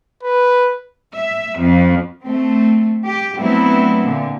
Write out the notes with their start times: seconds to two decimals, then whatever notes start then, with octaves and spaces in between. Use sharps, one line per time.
0.23 B4
1.16 E5
1.60 F2
2.25 A3 C4
3.05 G4
3.38 F#3 A3 B3 C4 D4 E4
4.04 A#2 D3